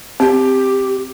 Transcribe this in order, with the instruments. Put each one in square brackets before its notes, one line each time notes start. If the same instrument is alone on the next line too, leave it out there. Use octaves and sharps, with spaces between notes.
[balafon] C4 [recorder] G4